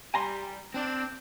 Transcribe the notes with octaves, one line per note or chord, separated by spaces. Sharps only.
G3 G#5 A#5 C6
C4 D4